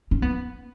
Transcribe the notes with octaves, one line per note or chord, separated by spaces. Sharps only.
C#4
B3